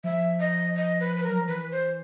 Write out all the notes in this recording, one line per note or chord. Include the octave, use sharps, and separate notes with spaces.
F3 E5
D#5
D#5
B4
B4
F#3 A#4
F3
E3 B4
C5